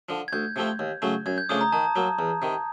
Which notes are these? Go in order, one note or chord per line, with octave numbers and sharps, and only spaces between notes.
D3 F3
G#6
D2 G6
C3 F3 A3 C4
D#2
C#3 F#3 A3
F#2 G#6
G6
C#3 F3 A3 D4 D#6
A#5
D#3 A5
F#3 A#3
E2
C3 D#3